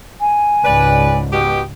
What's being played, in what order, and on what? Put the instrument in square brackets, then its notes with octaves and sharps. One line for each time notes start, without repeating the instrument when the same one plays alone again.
[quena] G#5
[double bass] C#2 G#2 [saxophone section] B4 D5
[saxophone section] B2 G4